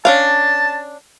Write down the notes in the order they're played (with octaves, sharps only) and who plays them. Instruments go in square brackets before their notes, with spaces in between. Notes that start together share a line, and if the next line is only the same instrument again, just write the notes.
[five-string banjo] C#4 D4 F5 [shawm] A5